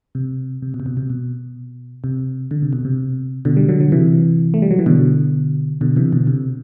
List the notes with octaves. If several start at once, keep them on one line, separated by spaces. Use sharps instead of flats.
C3
C3
B2
C3
B2
C3
B2
C3
D3
C3
B2
C3
B2 D3
G3
D3 F#3
F#3
C3 E3
A3
G3
F#3
E3
B2 D3
B2 D3
C3 E3
B2 D3
C3